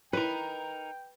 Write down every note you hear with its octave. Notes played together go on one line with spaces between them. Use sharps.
D#4 E4 A#4 B4 C#5 G5